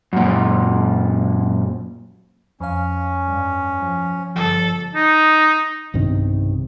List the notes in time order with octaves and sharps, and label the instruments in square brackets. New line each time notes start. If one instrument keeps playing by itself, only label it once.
[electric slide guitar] F#2 A#2
[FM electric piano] F2 F5 [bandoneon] C#4
[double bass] G2
F3
[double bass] G1 [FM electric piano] F3 [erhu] A4
[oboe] D#4
[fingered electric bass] B1 G2 C3 D#3